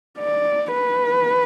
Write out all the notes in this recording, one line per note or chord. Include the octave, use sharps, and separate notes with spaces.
D5
B4